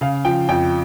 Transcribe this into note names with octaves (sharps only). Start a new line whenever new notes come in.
C#3 F5
F3 G5
F2 G5